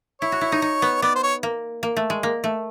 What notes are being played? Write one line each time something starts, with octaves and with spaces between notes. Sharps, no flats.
E4 C#5
F#4
E4
D#4
D#4
B3
B3 D5
C5
C#5
A#3
A#3
A3
G#3
A#3
A3